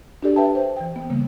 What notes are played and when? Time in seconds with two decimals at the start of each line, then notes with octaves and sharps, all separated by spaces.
0.23 D4 F#4 G4 A4 D5
0.36 B4 E5 G5 A5
0.55 C5
0.76 E3 G5
0.96 B3
1.10 C#3 G3 A#3